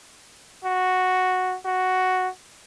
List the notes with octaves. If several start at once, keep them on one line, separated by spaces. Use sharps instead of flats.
F#4
F#4